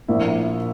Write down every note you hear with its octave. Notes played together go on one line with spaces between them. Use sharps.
A#1 A#2 A#3 E4